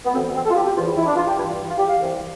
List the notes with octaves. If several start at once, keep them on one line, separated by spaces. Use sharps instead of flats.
B3
D2 C3 E3 C4
B3
C4
A4
F4
G4
G4
E2 C3 E3 F4
E4
E4
D4
F4
G4
G2 E3 E4
F4
F4
G4
F5
C2 C3 E3